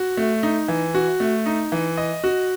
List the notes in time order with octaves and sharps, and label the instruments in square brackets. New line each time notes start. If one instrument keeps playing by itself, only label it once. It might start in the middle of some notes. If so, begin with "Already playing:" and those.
Already playing: [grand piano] F#4
A3
D#4
E3
F#4
A3
D#4
E3
D#5
F#4